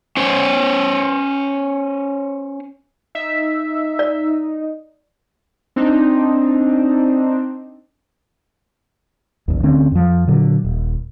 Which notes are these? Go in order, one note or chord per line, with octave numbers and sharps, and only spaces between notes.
C#4 C5 C#5
D#4 E5
D5
C4 D4 D#4
A1 D#2
D2 D3 C4 C#4
F2 F3
A#2 D3 F#3
D#1